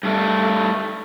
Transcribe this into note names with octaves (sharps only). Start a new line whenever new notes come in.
G2 A3